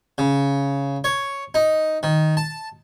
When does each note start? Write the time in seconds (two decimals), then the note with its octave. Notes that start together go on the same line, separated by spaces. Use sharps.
0.18 C#3
1.04 C#5
1.54 D#4
2.03 D#3
2.37 A5